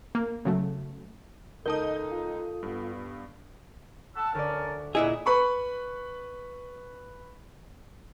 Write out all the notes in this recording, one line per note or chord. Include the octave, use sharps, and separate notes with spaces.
A#3
C#3 F#3 A3
C#2 D#4 A4 A#4 D#5 A5 D#6 G6
F4
G2 B3
F#5 A5 E6
D2 C#4 A#4 D5 A5
A#2 E4 G#4 D#5 E5 F#5 G#5
B4 B5 C#6